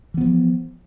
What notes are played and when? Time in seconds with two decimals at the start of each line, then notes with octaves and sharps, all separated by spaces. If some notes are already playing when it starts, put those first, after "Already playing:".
0.14 E3
0.18 B3
0.21 F3